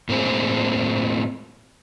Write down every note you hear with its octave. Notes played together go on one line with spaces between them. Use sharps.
A2 A#3 C4 G#4